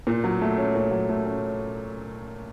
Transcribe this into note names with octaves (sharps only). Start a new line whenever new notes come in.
A#2
F#3
A3
C#4
A#2
F#3
A3
C#4